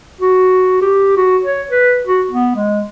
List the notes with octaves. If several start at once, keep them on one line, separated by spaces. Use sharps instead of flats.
F#4
G4
F#4
C#5
B4
F#4
B3
G#3